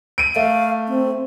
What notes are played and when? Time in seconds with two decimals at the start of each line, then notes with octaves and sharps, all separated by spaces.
0.18 D7 D#7
0.36 A3 F5
0.88 C4